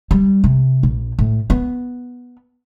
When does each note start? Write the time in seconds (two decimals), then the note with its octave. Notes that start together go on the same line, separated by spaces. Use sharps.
0.11 G3
0.44 C3
0.83 A#1
1.19 A2
1.50 B3